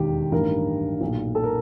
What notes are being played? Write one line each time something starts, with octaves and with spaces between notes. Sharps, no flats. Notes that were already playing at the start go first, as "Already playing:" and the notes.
Already playing: E1 D#2 D#3 G4
A1 G2 D#3 A#4
B1 A#2
A4
A#4